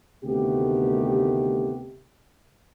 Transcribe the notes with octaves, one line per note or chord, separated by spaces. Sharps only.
D2 C3 D#3 A3 B3 G4